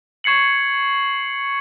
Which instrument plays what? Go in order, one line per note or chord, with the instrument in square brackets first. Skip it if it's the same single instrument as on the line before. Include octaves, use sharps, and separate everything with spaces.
[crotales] C#6 G#6 C7 C#7 F#7